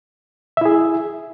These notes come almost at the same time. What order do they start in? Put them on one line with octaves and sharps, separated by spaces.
E5 E4 G#4